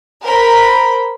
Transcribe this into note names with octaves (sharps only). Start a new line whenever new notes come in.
A#4 C5 B5